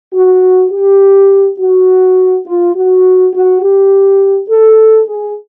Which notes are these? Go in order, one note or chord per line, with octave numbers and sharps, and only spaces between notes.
F#4
G4
F#4
F4
F#4
F#4
G4
A4
G#4